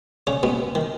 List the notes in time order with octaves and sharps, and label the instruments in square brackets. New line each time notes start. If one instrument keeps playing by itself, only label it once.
[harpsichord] C#3 C#4
B2 B3
D#3